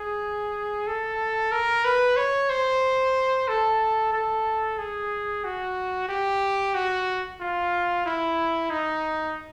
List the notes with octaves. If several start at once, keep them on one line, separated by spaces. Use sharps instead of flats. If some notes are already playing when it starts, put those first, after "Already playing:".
Already playing: G#4
A4
A#4
B4
C#5
C5
A4
A4
G#4
F#4
G4
F#4
F4
E4
D#4